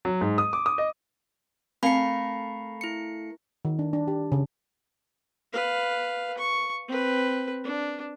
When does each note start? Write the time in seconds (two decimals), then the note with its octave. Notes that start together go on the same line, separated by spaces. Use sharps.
0.05 F#3
0.21 G#2
0.38 D#6
0.53 D6
0.66 D#6
0.78 D#5
1.83 A3 C4 A#4 F5 B5 C#7
2.81 E4 C#7
3.65 D#3
3.79 D4
3.93 D4
4.08 G4
4.32 C#3
5.53 B4 F5
6.38 C#6
6.88 C4 B4
7.64 D4